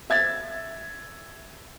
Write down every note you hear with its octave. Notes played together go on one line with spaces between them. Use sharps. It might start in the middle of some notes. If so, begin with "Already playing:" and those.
E5 G#6 A6